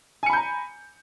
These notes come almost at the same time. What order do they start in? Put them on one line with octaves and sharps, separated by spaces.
G#5 C#7 B5 G6 A#5